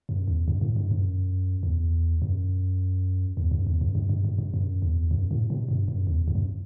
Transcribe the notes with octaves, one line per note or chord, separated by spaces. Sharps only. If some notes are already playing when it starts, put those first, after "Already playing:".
F#2
E2
G2
A2
G2
F#2
E2
F#2
E2
F#2
E2
F#2
G2
G2
G2
G2
F#2
E2
F#2
A2
B2
G2
F#2
E2
G2
F#2